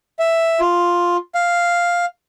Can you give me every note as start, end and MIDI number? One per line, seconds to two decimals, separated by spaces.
0.19 0.60 76
0.60 1.17 65
1.35 2.05 77